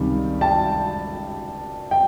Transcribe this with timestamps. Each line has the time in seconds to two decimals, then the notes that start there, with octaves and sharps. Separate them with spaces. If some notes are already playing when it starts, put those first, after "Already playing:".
Already playing: C#2 C3 D#3 G3
0.41 G5 A5
1.91 G5